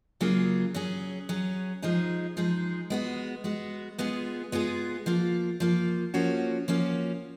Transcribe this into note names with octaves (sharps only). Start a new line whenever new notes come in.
C#3 F#3 A#3 F4 G#4
F#3 C#4 G#4
F#3 C#4 G#4
F3 G#3 D#4 G#4
F3 G#3 D#4 G#4
G#3 B3 F#4
G#3 B3 F#4
G#3 B3 F4 G#4
G#3 B3 F4 G#4
F3 A#3 F4
F3 A#3 F4
F3 A#3 C#4 F#4
F3 A#3 C#4 F#4